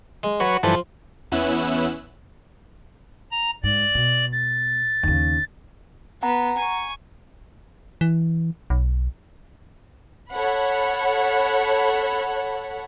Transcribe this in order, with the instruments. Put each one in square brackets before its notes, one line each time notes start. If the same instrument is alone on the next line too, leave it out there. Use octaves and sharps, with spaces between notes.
[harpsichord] G#3
[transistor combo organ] F#3 B4 C#5 [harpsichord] F#4
[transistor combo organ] G2 E3 A4 [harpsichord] F3
[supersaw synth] E2 B3 C#4 E4 E6 F#6
[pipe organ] A#5
[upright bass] G#2 [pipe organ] D5
[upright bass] B2
[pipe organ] A6
[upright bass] D#2 C#3
[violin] B3 [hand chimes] F#5 A#5
[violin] G#5 C#6
[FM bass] E3
B1
[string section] A4 C#5 F#5 B5